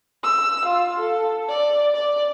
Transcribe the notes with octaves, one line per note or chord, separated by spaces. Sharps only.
E6
F4
A4
D5
D5